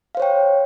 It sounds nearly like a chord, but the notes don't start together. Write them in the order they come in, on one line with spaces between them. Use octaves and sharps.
F5 C5 C#5 G5